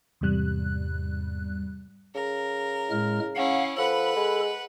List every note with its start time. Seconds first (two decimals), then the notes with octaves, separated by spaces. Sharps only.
0.21 E2 G#2 C3 G3 F#6
2.15 C#3 A#4
2.91 A2 G#3 F6
3.35 C#4 E4 F5 F#5
3.78 F3 A4 B4 F#5 B5
4.16 G#3